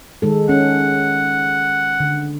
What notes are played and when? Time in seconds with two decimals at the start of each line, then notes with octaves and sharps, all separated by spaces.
0.22 D#3 G#3 A4
0.49 C#4 F#5
2.00 D3